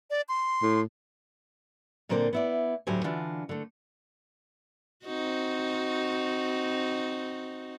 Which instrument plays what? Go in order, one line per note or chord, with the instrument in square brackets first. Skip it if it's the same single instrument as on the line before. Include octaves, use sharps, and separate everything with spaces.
[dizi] D5
C6
[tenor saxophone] A2
[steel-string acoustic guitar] A#2 D3 A#3 C4 C5 D5
B3 E4 D5
D2 A2 F#3 G4 C5 G#5
D3 E3 D4 F4 F#4
D3 A3
[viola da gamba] C4 D#4 F#4